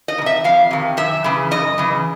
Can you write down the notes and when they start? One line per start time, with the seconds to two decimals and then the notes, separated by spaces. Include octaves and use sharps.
0.08 D#5
0.18 D#3
0.22 C3 E5
0.44 F2 F5
0.71 C3 D#3
0.97 F#2 E5
1.24 C#3 E3
1.51 F#2 D#5
1.78 C#3 E3